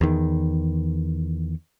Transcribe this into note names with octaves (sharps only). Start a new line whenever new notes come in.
E2 D#3